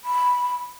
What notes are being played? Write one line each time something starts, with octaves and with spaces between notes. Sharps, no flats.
B5